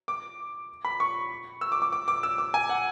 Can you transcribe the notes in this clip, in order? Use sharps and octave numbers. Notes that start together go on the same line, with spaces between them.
D6
B5
C#6
E6
D6
D6
D6
D6
E6
D6
G#5
F#5